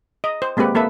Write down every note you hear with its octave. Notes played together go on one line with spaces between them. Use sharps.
D#5
C5
G#3 A#3 C4 G4 B4
A#3 A4 B4 E5